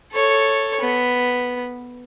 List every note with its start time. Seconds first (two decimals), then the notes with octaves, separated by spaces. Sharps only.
0.12 A4 C#5
0.81 B3